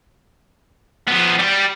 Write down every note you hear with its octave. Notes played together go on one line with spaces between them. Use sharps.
F3 B3
G3 G5